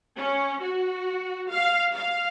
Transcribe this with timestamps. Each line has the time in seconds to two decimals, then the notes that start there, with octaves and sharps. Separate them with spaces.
0.18 C#4
0.61 F#4
1.50 F5
1.95 F5